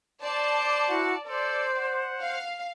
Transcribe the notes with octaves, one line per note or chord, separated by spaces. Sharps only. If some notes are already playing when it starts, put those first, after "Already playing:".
C5 D5 A5
D6
E4 F#4
A4 C5 D5
F#5
F5